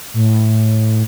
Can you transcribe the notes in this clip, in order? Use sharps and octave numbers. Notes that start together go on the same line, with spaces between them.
A2